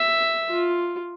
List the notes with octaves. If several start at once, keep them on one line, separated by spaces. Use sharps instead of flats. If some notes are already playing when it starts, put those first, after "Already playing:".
Already playing: E5
F4